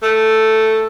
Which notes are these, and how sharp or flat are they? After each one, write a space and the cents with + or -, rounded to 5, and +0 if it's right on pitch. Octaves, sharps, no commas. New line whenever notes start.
A3 +0